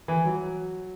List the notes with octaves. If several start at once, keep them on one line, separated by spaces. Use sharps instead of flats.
E3
F#3